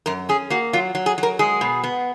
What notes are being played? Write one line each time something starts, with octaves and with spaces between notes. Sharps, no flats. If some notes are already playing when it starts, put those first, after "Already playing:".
F#2 A#4
C#4 G#4
A#3 F#4
F#3 F4
F#3
G#4
F#3
A#4
G#3 G#4
B2
B3